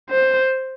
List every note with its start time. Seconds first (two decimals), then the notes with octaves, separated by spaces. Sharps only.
0.10 C5